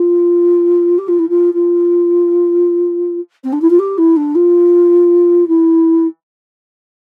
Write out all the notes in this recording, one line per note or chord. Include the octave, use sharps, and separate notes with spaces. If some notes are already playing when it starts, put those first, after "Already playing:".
Already playing: F4
G4
F4
E4
F4
F4
C4
D4
E4
F4
G4
E4
D4
F4
E4